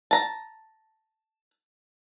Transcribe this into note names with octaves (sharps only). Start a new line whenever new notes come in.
A5 A#5